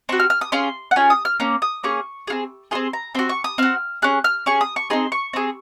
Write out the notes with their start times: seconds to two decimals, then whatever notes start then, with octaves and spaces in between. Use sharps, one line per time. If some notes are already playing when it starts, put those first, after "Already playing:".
0.09 C4 F#4 C#6
0.20 F6
0.30 F6
0.41 D#6
0.52 C#4 F4 G#4 C6
0.91 F#5
0.96 C#4 F4 G#4 G#5
1.10 D#6
1.25 F6
1.40 A#3 C#4
1.62 D#6
1.83 A#3 C#4 G#4 C#6
2.27 C4 F4 G#4
2.71 F4 G#4 C6
2.75 C4
2.93 A#5
3.15 C4 F#4 C6
3.29 C#6
3.44 D#6
3.58 C4 F#4 F6
4.02 C#4 G#4 F#6
4.24 F6
4.46 C#4 G#4 C#6
4.61 D#6
4.76 C#6
4.90 C4 D#4 G#4 C6
5.12 C#6
5.33 C4 D#4 G#4